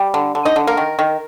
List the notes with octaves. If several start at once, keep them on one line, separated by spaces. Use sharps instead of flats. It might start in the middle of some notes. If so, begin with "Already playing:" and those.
Already playing: G3 G4
D3
D3
D#4 D#5
D3
A#3 A#4
D#3
D#3